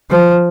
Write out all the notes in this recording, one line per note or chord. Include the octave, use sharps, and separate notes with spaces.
F3